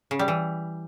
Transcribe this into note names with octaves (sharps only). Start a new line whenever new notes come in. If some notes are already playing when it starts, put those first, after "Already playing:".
C#3
G3
E3